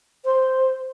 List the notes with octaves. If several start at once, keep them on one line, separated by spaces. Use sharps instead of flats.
C5